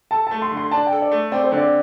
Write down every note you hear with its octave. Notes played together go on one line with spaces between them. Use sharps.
A4 A5
A3 A5
C6
D3
C6
D4 A5
G5
A4
D5
A3
C4 D5
C5
D3
D5